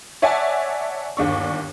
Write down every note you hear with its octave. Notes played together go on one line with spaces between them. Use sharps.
C#5 D5 E5 F#5 G#5 A5
G1 D#2 D4 C#6